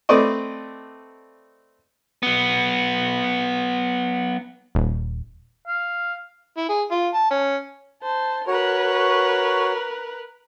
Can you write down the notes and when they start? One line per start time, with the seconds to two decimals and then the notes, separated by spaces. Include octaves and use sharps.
0.09 A3 C4 B4 D5 D#5
2.23 F#3 B3
4.75 D#1
5.68 F5
6.57 E4
6.69 G#4
6.91 F4
7.14 A5
7.31 C#4
8.02 C5 A5
8.47 F#4 A#4 B4 C#5